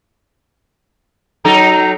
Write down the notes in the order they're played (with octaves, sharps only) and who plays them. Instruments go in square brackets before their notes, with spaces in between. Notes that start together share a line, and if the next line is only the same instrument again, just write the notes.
[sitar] F#3 D#4 A4 [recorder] A#5